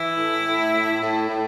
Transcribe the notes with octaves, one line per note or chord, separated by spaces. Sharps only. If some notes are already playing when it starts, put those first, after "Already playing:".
Already playing: E3 E4
A2
A2
A2
A2
A2